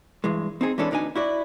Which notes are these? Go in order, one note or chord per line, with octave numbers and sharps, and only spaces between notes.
G2 E3 G#3
C4 D#4 G#4
E3 G#3 C#4 D4 A4 B4
D2 D4 D#4 B4 G#5
E4 F#4 D5